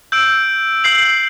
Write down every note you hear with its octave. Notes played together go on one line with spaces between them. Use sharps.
E6 G6 D7
E6 G6 C7 F#7